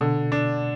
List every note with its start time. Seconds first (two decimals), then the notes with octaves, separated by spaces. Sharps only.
0.01 B2 D3
0.32 D4